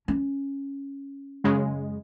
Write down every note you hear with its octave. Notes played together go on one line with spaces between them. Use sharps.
C#4
F#2 C#3 G#3